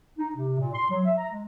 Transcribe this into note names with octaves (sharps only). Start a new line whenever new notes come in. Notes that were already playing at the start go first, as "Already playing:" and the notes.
D#4
C3
A#2
C6
F#3
E5
A#5
G#3